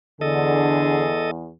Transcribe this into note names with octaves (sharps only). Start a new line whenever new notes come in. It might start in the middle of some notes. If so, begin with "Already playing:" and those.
E2 D3 G#4 A4 D#5